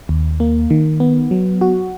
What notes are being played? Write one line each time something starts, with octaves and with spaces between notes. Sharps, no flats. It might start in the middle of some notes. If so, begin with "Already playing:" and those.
D#2
A#3
D#3
B3
F#3
F#4